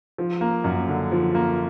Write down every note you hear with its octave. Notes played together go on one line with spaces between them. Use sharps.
F3
A#3
F#2
D3
F3
A#3